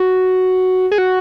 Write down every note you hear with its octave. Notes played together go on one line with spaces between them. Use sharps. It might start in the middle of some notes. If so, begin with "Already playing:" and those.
Already playing: F#4
G#4
F#4